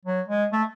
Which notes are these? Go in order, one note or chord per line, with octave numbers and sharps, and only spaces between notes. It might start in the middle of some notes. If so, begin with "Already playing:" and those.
F#3
G#3
A3